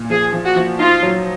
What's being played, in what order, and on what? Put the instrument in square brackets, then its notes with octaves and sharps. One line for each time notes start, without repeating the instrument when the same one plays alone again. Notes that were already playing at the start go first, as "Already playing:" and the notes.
Already playing: [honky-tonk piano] A#2
[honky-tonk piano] F3 [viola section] G#4
[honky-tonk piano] F3
[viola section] F#4
[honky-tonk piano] F3
[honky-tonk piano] D#4 [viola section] F4
[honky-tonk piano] F#3